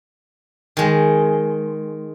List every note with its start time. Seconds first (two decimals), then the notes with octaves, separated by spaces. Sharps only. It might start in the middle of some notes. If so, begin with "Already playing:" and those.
0.77 D#3 G#3